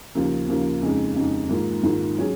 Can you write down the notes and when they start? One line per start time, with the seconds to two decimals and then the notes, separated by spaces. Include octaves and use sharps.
0.15 D#2 C#3 F3 A#3
0.49 D#2 C#3 F3 A#3
0.82 F2 C#3 G#3 D#4
1.16 F2 C#3 G#3 D#4
1.49 G#2 D#3 A#3 F4
1.83 G#2 D#3 A#3 F4
2.17 F#3 C#4 G#4